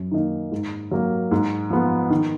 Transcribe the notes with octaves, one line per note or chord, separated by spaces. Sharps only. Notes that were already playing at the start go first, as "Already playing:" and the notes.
Already playing: F#2
D#3 A#3 D#4
G#2
F#3 A#3
G#2
F3 B3
D#3